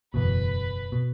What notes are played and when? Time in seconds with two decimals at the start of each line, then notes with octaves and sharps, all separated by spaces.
0.14 F#1 E2 B2 B4
0.92 B2